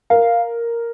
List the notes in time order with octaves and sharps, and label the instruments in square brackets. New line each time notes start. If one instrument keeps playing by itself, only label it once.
[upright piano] A#4 [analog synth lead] F5